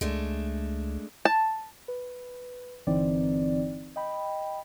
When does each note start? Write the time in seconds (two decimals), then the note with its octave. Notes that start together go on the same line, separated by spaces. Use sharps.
0.01 C#2 G#3 A3 D4
1.25 A5
1.88 B4
2.87 G1 D3 E3 C4 D#4 D5
3.96 D#5 G5 B5